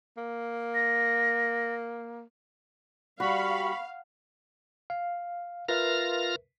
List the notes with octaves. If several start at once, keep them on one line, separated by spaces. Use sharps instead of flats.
A#3
A#6
G3 F#4 F5 B5 C#6
F5
F4 A#4 B4 E5 F6 A#6